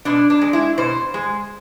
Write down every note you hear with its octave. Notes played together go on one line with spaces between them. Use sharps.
B2 D4
D4
G#3
E4
B2 C5
G#3